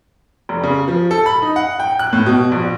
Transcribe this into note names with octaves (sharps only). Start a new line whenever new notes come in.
F1
C#3
F3
A4
B5
D#4
F#5
G5
F#6
A2
B2
A#1